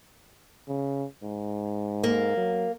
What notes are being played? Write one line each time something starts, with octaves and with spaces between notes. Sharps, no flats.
C#3
G#2
A#3
F#3